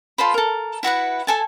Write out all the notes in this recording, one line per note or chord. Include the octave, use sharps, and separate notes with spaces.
F4 A4 C5 B5
A4 A#4
E4 F#4 B4 F#5
A4 G#5 A5